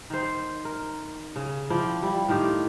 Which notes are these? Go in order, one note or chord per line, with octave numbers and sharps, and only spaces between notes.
D#3 C5
A#4
C#3
F3 E4 D5 G5
G3 E4
A2 D#3 F4 G4